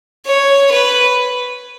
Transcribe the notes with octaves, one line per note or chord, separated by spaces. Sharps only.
C#5
B4